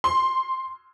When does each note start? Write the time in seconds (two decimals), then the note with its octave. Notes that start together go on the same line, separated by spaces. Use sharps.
0.04 C6